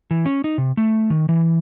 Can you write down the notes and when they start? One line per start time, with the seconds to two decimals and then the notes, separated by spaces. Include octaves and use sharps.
0.11 E3
0.26 C#4
0.44 D#4
0.58 C3
0.77 A3
1.10 D#3
1.29 E3